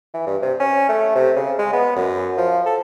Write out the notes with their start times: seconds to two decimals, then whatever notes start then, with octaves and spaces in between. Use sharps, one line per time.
0.14 E3
0.27 G2
0.42 C3
0.60 C#4
0.89 A3
1.15 C3
1.36 C#3
1.59 G#3
1.73 B3
1.96 F#2
2.38 F3
2.66 A4